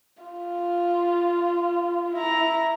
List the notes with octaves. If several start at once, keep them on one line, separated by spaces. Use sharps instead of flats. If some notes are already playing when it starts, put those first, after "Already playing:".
F4
E4 A#5